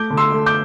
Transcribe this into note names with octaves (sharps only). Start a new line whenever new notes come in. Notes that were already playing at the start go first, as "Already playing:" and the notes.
Already playing: A3 D6 G6
D3
C6 E6
A3
D6 G6